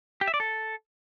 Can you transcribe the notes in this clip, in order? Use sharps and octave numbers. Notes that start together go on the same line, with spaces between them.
G4
E5
D5
A4